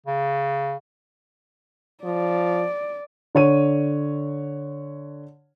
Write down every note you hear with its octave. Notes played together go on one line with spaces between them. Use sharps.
C#3
F3 D5
D3 C#5 D#7